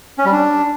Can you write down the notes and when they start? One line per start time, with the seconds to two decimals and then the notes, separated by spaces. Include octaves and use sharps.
0.18 C#4
0.25 G3
0.32 D4